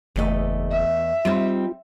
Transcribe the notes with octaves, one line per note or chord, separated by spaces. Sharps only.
F#1 E2 A3 D#5
E5
G3 C4 D#4 F4